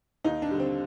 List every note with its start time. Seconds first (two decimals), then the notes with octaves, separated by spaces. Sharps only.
0.24 D#2 D#4
0.42 D4
0.51 D3 G3
0.60 C4